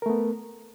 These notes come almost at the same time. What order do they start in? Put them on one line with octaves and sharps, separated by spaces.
A#4 A3 B3